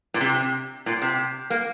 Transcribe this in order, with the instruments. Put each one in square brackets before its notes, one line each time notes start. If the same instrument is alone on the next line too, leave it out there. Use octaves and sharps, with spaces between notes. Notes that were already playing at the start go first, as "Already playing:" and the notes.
[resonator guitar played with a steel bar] A#2
C3
A#2
C3
A#3